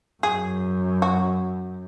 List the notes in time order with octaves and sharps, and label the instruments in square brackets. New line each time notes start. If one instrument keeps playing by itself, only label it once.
[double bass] F#2 [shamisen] G#4
[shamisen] F#4